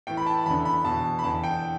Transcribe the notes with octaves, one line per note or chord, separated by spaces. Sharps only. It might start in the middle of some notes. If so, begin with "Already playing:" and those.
A2 E3 G5
B5
A5
E2 D3 B5
B5
E2 B2 A5
B5
E2 D3 A5
G5